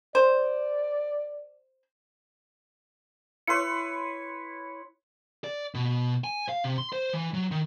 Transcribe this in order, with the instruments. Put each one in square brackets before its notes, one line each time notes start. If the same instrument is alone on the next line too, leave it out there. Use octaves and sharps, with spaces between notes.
[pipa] C5 [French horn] D5
[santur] E4 B4 C#5 [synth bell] C6 C#7
[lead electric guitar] D5
B2
G#5
F5
C3
C6
C5
E3
F#3
D#3